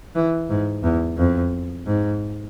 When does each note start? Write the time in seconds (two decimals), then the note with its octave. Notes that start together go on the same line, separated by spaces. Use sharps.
0.15 E3
0.49 G#2
0.83 E2
1.17 F2
1.86 G#2